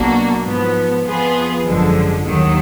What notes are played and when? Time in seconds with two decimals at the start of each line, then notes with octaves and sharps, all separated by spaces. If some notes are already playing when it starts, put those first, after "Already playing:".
Already playing: B1 B2 A#3 D4 F#4
0.43 G#2 F3 B3
1.03 F2 F3 B3 F4 G#4
1.63 G#1 F#2 D3 F3 G#3
2.23 D#2 D#3 F#3